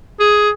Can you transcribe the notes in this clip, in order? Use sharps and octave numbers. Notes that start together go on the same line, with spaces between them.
G#4